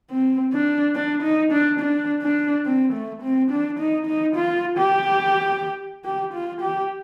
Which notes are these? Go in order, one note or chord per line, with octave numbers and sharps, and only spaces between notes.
C4
D4
D4
D#4
D4
D4
D4
C4
A3
C4
D4
D#4
D#4
F4
G4
G4
F4
G4